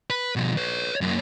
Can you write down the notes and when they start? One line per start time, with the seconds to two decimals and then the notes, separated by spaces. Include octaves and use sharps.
0.10 B4
0.36 B2 F3
0.57 B4 C#5
1.01 F#2 A#3